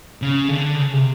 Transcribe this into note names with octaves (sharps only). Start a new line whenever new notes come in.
C#3
D3
C#3
C3